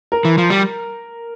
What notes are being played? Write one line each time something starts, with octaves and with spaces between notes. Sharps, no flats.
A#4
E3
F3
G3